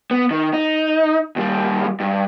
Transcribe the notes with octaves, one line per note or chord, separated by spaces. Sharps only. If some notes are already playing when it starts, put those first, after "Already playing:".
B3
D#3
D#4
D#2 G3
G2